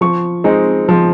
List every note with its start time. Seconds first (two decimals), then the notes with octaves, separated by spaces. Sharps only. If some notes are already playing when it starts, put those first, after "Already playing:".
0.01 F3 C#6
0.44 G#3 C4 D#4
0.89 F3